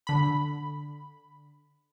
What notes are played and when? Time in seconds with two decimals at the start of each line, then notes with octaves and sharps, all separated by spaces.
0.07 D3 B5